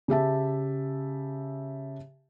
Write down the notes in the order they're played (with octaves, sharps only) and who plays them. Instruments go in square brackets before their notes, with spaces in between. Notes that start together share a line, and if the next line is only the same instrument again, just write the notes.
[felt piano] C#3 G4 E5 A5